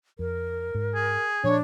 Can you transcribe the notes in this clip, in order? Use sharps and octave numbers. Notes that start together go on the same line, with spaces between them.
F2 A#4
G#2
G#4
A#2 F3 D4 C#5